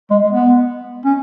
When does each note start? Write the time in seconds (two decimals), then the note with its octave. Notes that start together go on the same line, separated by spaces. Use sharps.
0.11 G#3
0.30 B3
1.05 C#4